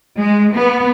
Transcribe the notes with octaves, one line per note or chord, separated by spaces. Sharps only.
G#3
B3